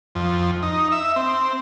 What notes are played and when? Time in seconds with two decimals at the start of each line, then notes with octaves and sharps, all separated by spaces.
0.15 F2
0.63 D#4
0.92 E5
1.16 C4